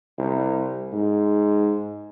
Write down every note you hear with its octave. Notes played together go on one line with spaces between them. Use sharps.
C2
G#2